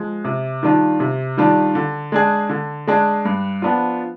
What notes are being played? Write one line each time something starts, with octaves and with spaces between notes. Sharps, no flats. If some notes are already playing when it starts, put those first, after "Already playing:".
Already playing: F3 G#3
C3
D#3 G3 D4 F4
C3
D#3 G3 D4 F4
D3
G#3 D4 G#4
D3
G#3 D4 G#4
G2
F3 B3 D4 F4